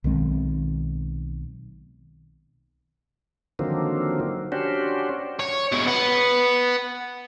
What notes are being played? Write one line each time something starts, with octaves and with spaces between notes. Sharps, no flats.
B1 D#3 G#3 C4
D3 D#3 F3 F#3 A#3 C4
C#4 D4 F#4 G4 C5
C#5
B2 G#4
B3